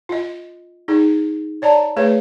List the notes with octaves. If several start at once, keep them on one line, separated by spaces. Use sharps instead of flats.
F4 D#5
D#4 G#4
C#5 D5 A5 A#5
A3 G#4 B4 C#5